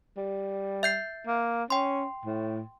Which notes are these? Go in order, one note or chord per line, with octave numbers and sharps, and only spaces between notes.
G3
E5 G6 C7
A#3
C#4 G5 C6
A2